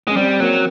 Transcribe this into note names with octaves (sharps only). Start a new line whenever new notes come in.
G#3 C#4
G3 C4
F#3 A#3